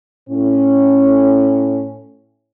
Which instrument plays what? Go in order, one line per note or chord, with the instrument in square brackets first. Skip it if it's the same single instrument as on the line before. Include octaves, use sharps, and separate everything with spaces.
[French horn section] A2 C#4